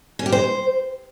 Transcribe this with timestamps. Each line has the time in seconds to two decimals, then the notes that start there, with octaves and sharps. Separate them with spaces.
0.19 C#4
0.26 G4
0.32 C5